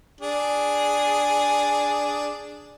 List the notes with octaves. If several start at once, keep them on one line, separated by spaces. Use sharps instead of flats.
D4 G#4